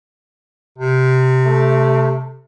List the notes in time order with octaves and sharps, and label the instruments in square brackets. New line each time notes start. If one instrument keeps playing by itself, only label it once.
[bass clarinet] C3
[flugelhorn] A3